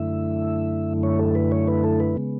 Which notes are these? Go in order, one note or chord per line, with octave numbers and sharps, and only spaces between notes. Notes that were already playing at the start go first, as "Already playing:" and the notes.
Already playing: F#2 D3 A3 E4 E5
C#5
A4
B4
C#5
B4
A4
B4
C#3 G#3 B3